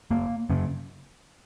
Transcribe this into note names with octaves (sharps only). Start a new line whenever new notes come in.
F#1 A#3
F#2 C#3